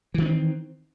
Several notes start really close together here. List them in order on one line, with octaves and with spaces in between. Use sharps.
E3 D#3 D4 C4